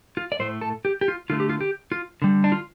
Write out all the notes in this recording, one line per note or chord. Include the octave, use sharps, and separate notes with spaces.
F4
D5
A2 A3 C5
A4
G4
G4
F4
D3 A3 F4
G4
F4
G4
F4
D3 G3
D4
F4